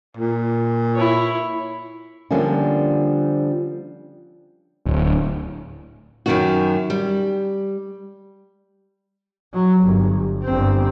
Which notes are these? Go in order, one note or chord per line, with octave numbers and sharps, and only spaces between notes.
A#2
E4 C#5
D3 F3 G3 A#3 C#4 D4
D1
F#2 D#3 F#4
G3
F#3
G1
G1 C4